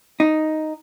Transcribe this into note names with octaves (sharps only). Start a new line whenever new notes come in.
D#4